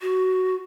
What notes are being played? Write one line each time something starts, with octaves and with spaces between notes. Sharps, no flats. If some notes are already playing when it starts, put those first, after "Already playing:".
F#4